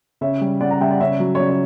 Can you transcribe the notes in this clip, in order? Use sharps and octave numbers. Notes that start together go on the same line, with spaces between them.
C#3 C#5 E5
G3
C#3 D5 F#5
F#5 A#5
G3 E5 G5
D5 F#5
C#3 C#5 E5
F#3
C#5
C#3 D5
C#5